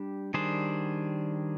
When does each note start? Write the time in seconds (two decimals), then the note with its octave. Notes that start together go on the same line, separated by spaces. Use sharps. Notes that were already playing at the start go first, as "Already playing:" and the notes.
Already playing: G3 D4 G4
0.34 D#3 G3 D4 G#4 C5